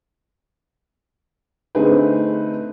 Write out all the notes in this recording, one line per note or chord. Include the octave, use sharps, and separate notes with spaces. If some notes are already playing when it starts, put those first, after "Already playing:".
D3 A3 C4 D#4 G#4 B4